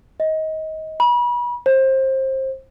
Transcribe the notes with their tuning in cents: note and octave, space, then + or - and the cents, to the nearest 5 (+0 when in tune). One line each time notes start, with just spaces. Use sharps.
D#5 +20
B5 -35
C5 +25